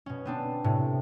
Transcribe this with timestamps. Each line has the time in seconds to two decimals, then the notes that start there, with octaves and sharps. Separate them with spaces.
0.06 B2 C#4
0.25 B3 C4 D4
0.64 A2 C3